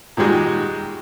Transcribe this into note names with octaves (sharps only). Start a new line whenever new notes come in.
A#2 D#3 G3 G#3 F#4